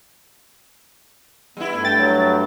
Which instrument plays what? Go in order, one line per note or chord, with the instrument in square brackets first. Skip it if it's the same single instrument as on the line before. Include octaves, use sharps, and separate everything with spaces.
[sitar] G3 E4 [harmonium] B3
[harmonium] G2 A3
[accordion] G5 [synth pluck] A6
[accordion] F#3